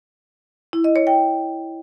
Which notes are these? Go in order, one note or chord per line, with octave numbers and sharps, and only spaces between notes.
E4
D#5
C#5
G5